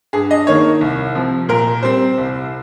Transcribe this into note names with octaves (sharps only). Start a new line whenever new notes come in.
G2 G#4
D#5
D#3 A#3 C#5
C2
C3 F3
A#2 A#4
G3 C4 C5
C2